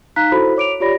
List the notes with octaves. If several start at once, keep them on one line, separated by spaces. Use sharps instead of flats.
D#4 F5 A#5 F#6 B6
E4 F#4 A4 C5 B5
C#5 D6 D7 F7
F4 G4 C#5 D5 B5 A#6